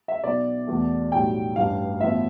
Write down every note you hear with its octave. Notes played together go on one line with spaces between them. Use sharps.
E5
B1 B2 B3 D5
E2 B2 A3
B1 A2 G3 G5
A1 G2 E3 F5
A1 A2 F3 B3 E5